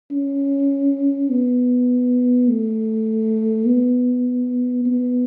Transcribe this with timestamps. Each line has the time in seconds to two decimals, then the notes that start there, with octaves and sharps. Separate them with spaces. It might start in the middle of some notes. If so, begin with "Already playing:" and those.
0.12 C#4
1.30 B3
2.49 A3
3.67 B3
4.86 B3